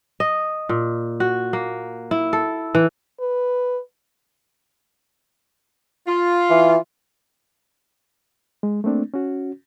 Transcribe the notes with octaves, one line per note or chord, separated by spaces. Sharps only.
D#5
A#2
F#4
A#3
E4
A4
E3
B4
F4
E3
G#3
A3 A#3 C4 D4
C#4 F#4